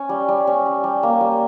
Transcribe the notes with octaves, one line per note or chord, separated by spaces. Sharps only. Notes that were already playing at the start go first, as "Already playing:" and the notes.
Already playing: C#4
G3
G3
C#4
G3
G3
A#3
G3